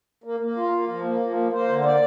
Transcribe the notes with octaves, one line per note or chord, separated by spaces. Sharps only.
A#3
A#3
F4
A#3
F3
A#3
F3
A#3
A#3 C5
D3
C5
A#3 D5